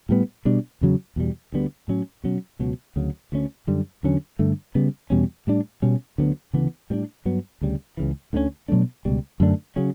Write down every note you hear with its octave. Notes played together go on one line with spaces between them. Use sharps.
A2 G3 B3
B2 G3 D4
E2 C#3 F#3
E2 B2 G3
D2 D3 G3 B3
A2 F#3 C#4
B2 F#3 C#4
C#2 B2 F#3
D2 C#3 F#3
D2 D3 A3 C#4
F#2 D3 G3
E2 D3 F#3 C#4
G2 D3 A3
C#3 G3 B3
E2 B2 G3 C#4
A2 G3 D4
B2 G3 C#4
D2 D3 F#3 B3
D2 C#3 E3 B3
A2 G3 B3 D4
G2 F#3 B3
D2 C#3 G3
C#2 C#3 E3
D2 D3 G3 C#4
B2 F#3 A3 D4
C#2 B2 G3
F#2 D3 A3 D4
C#3 F#3 C#4